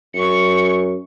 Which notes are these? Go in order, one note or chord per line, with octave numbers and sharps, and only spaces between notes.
F#2 C#6 C#7